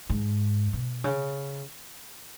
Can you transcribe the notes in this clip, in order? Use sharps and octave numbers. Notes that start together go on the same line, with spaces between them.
G#2
B2
C#3